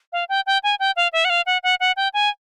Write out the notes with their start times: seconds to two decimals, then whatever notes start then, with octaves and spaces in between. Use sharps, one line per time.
0.13 F5
0.29 G5
0.46 G5
0.63 G#5
0.80 G5
0.96 F5
1.13 E5
1.25 F#5
1.30 F5
1.46 F#5
1.63 F#5
1.80 F#5
1.97 G5
2.14 G#5